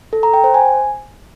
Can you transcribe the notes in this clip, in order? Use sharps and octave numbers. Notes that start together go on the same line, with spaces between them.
A4
A#5
G5
C5
G#5